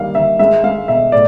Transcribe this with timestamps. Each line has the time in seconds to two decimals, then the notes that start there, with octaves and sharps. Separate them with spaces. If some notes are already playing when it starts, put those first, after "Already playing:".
Already playing: D#3 G3 A#3 F5
0.15 D#3 E5
0.39 G#3 E5
0.64 G#3 F5
0.88 B2 E5
1.12 A2 D5